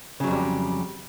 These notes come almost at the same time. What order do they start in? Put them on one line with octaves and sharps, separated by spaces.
C#3 F#3 F2 G3